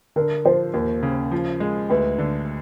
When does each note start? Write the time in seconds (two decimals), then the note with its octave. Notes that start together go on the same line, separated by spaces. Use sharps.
0.16 D3 A#4
0.45 F3 C5
0.74 D#2 A#4
1.03 C#3
1.31 F3
1.60 G#3
1.90 D2 B4
2.18 D3